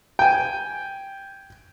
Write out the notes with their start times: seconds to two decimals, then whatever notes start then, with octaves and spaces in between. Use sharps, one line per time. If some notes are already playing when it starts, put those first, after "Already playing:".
0.19 G5 G#5